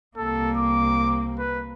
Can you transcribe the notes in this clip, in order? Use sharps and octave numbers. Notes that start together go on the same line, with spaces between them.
C2 A#3 A4
D6
B4